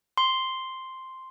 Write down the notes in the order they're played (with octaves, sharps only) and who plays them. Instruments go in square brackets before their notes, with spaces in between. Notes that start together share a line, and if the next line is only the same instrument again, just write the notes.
[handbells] C6